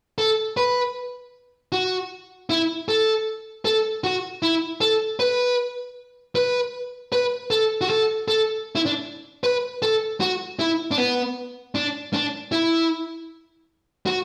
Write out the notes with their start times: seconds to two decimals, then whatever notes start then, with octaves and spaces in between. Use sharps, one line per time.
0.18 A4
0.57 B4
1.72 F#4
2.50 E4
2.88 A4
3.65 A4
4.04 F#4
4.42 E4
4.81 A4
5.20 B4
6.35 B4
7.12 B4
7.51 A4
7.81 F#4
7.90 A4
8.28 A4
8.75 E4
8.86 D4
9.44 B4
9.82 A4
10.20 F#4
10.59 E4
10.91 D4
10.98 B3
11.75 D4
12.14 D4
12.52 E4
14.06 F#4